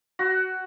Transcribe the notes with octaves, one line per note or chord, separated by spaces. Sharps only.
F#4